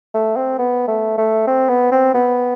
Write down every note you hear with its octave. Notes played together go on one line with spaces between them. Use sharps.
A3
C4
B3
A3
A3
C4
B3
C4
B3